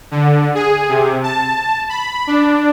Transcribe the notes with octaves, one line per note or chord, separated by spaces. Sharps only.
D3
G#4
C3
A5
B5
D4